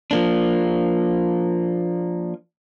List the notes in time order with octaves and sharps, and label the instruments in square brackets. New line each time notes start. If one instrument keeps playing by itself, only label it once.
[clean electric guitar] F3 A#3 D4